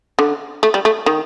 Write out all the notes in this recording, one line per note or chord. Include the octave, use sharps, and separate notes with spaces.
D3
A3
G3
A3
D#3